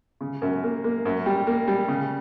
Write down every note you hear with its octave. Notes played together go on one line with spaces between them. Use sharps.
C#3
F#2
A#3
A#3
F#2
G3
A#3
G3
C#3